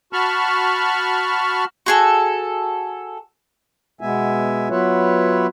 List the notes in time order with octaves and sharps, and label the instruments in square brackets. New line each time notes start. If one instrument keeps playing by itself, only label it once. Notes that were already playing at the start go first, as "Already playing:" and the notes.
[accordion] F#4 A5 B5 C#6 F6
[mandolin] F#4 G#4 A4
[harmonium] B2 G#3 B3 E5 G#5
F#3 B3 F4 B4 C#5 E5